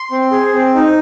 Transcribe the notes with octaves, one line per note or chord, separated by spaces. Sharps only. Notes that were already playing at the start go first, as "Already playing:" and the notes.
Already playing: C6
C4
G#4
C4
D#4